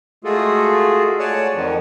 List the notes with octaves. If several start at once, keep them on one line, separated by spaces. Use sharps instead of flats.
G#3 A3 F4 F#4 G#4 A4
C#5 D5 F#5 G#5 A5
F2 D#3 F3